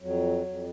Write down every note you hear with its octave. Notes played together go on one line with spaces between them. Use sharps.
F2 F#3
F2